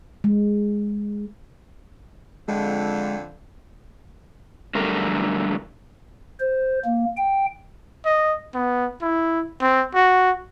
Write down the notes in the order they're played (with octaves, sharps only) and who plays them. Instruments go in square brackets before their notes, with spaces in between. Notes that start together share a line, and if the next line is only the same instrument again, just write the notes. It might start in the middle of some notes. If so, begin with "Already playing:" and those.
[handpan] G#3
[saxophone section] F2 D3 [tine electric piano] G#3
[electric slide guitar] F#2 D3 G3 A3 A#4
[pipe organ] C5
A#3
G5
[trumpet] D#5
B3
E4
C4
F#4